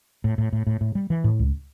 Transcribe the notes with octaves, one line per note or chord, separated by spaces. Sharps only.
A2
A2
A2
A2
A2
G3
E3
A2
C#2